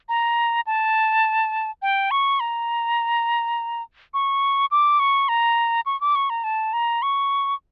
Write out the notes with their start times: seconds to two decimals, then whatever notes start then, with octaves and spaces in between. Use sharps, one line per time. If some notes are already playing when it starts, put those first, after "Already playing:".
0.09 A#5
0.67 A5
1.82 G5
2.11 C#6
2.40 A#5
4.14 C#6
4.71 D6
4.99 C#6
5.29 A#5
5.86 C#6
6.01 D6
6.15 C#6
6.30 A#5
6.44 A5
6.73 A#5
7.02 C#6